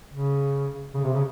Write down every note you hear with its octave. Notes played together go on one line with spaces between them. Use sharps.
C#3
C#3
C3
C#3